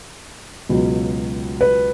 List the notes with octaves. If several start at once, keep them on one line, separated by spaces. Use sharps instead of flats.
C#2 B2 F#3
B4